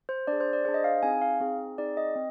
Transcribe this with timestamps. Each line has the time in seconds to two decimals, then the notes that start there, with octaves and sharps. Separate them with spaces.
0.09 C5
0.27 D4 G#4 D5
0.40 C5
0.53 D5
0.65 G#4 C5
0.69 D4
0.74 D#5
0.84 F5
1.03 C4 D#4 G#4 G#5
1.22 F5
1.41 C4 D#4 G#4
1.78 C4 D#4 G#4 D5
1.97 D#5
2.15 C4